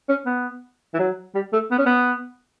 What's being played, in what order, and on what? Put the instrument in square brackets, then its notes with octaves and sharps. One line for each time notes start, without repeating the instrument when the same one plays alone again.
[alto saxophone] C#4
B3
E3
F#3
G3
A3
B3
C#4
B3